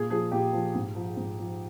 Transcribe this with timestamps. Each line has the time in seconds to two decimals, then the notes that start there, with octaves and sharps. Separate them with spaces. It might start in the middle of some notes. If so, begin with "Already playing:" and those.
Already playing: A#2 G#4
0.10 F3 G#4
0.31 A#2 G4
0.53 F3
0.75 G#2
0.95 F3
1.16 G#2
1.38 F3